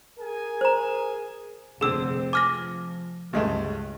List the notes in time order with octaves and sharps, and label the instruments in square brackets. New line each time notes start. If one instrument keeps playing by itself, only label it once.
[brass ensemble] G#4 A#4 G#5
[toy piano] C5 A#5
[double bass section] F1 C4 [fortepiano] D3 [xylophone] G#4 E6
[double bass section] F3 [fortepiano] G#5 [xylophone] D6 F6 A#6
[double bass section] C#2 [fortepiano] G2 G#3 A3